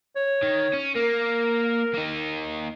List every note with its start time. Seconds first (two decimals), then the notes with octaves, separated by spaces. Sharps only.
0.16 C#5
0.43 D#3
0.73 C#4
0.96 A#3 A#4
1.94 A#3 D#4